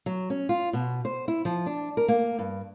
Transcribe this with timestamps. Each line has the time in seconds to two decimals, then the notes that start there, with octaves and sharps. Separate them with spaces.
0.06 F#3
0.30 C#4
0.49 F4
0.73 B2
1.05 C5
1.28 E4
1.45 F3
1.66 D4
1.97 A#4
2.08 A#3
2.39 G2